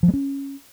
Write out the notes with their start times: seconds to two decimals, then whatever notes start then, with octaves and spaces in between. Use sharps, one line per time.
0.03 F3
0.08 G#3
0.14 C#4